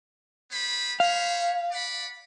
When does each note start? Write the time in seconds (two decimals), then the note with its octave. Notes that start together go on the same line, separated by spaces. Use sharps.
0.50 B3 C5 B5
1.00 C5 C#5 F5 B5
1.71 D5 F#5 B5